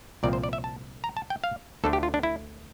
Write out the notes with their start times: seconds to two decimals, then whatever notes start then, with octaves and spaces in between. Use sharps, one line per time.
0.23 C2 A#2 F3 C4 D5
0.33 C5
0.43 D5
0.53 E5
0.64 A5
1.04 A#5
1.17 A5
1.30 G5
1.44 F5
1.84 D2 D3 A3 D4 A4
1.93 G4
2.03 F4
2.14 D4
2.23 E4